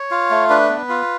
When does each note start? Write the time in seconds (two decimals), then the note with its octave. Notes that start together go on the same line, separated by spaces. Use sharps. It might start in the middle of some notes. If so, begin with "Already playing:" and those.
Already playing: C#5
0.11 F4
0.30 A3
0.50 D4 B4
0.69 B3
0.89 F4